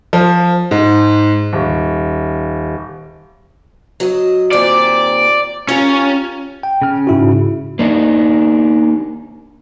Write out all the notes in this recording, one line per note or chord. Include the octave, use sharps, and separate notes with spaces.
F3
G#2
D#1
F#3 D#5
D#2 A#2 C4 D5
C#4 F4 G4 A#4
G5
C#3 F6
G#2 E4 F#4
A#3 D4 D#4